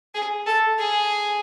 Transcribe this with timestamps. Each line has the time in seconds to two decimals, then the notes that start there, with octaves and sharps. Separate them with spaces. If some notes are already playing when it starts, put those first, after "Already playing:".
0.15 G#4
0.46 A4
0.78 G#4